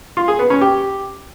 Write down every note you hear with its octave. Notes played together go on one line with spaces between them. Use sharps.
F4
G#4
B3
C#4
G4